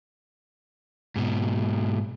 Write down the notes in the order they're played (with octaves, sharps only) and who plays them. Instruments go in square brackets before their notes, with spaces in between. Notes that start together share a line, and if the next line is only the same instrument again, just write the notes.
[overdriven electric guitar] G#2 B2